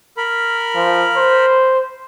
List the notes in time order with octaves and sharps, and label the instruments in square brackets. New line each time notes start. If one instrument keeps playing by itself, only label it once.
[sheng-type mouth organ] A#4 B5
[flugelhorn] F3
C5